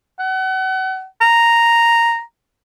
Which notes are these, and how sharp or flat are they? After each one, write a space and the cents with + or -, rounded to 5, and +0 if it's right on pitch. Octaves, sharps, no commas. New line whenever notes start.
F#5 +35
A#5 -5